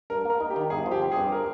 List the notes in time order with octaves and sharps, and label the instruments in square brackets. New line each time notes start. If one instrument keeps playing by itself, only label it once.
[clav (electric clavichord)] G2 [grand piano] A#4
[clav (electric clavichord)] A#3 [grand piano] A#4
[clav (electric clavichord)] D#4
[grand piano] G4
[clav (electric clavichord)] D#3
[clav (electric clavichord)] G1 [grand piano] G#4
[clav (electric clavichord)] F3
[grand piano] G4
[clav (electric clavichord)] C4
[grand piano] G#4
[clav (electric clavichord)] G2
[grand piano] A#4